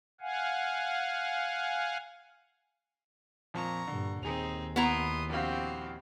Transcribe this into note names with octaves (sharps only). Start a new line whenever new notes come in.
F5 F#5 G#5
F2 A#2 F3 A#5 C#6
G2 A#2 D3
D#2 C4 D#4 G#4 F7
B3 E4 A#5 C6 D#6
A#1 C4 F#4 G4 F5